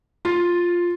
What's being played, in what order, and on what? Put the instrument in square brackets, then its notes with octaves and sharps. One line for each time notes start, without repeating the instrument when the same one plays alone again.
[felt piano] F4